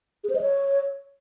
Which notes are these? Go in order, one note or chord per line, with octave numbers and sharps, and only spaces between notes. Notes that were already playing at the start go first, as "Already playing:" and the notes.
G#4
C5
D#5
C#5